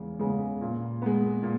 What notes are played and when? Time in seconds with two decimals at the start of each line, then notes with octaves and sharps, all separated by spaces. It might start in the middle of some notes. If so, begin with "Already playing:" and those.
Already playing: E2 C#3 G#3
0.19 C#3 G#3 B3
0.61 A#2
1.02 G#3 B3
1.43 A#2